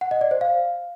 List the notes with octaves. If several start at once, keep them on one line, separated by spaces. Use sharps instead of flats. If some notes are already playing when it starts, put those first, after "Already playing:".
F#5
D#5
D5
C5
F5